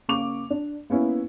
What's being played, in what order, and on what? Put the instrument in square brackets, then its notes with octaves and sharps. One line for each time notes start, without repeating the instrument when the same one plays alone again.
[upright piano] C#3 A#3 C#6 D6 F7
D4
A#3 B3 C#4 E4